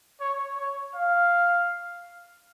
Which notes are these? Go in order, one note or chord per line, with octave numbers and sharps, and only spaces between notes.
C#5
C#5
F5